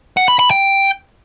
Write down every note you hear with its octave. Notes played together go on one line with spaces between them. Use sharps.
F#5
B5
B5
G5